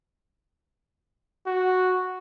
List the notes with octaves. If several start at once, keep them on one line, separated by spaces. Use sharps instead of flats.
F#4